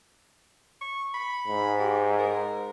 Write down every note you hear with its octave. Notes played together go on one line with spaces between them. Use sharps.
C#6
B5
G#2
G4
A#4